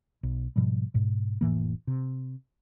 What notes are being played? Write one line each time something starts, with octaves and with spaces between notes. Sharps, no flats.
B1
G#2 B2 F3 G3
G#2 B2
F1 A2 E3 A#3
C3